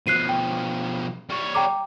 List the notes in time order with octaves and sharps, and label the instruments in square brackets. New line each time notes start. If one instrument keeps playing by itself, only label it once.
[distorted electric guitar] B2 F3 [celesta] F#6 C7 D#7
[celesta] G5
[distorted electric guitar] G3 C#5
[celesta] G5 A#5 D6